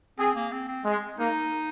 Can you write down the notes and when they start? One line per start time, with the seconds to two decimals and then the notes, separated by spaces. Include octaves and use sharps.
0.18 C4 G#4
0.35 A#3
0.52 C4
0.68 C4
0.85 G#3
1.18 A#3 D#4